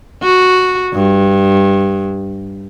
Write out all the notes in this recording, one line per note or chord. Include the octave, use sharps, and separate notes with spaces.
F#4
G2